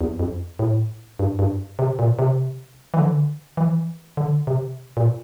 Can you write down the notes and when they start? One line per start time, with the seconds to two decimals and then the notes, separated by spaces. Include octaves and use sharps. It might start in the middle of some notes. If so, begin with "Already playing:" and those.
0.01 E2
0.19 F2
0.59 A2
1.19 G2
1.39 G2
1.79 C3
1.99 A#2
2.19 C3
2.94 E3
2.98 D3
3.57 E3
4.17 D3
4.47 C3
4.97 A#2